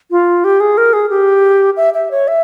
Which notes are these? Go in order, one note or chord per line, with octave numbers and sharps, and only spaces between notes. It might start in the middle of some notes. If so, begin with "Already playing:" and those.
F4
G4
G#4
A#4
G#4
G4
E5
E5
C#5
E5